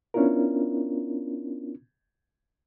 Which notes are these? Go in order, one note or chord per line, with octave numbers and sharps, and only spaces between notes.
B3 C#4 D4 E4 F4 A#4